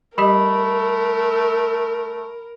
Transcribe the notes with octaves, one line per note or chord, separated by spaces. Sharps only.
G3 A3 G4 A#4 D#5 B5